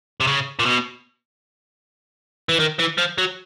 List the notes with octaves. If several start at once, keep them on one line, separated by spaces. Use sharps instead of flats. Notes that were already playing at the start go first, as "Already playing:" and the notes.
C3
C#3
A#2
B2
E3
D#3
E3
F3
F#3